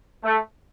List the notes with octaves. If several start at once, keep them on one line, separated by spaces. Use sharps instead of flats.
A3